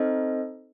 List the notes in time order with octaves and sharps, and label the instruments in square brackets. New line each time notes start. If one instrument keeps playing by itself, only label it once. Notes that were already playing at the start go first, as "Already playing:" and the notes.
Already playing: [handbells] C4 D#4 A4 C5 D#5